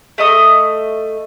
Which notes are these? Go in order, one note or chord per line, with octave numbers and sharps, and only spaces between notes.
A3 D#5 D#6